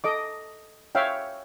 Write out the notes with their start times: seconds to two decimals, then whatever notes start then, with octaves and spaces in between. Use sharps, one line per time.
0.04 A4 D#5 D6
0.95 C#5 E5 F5 G5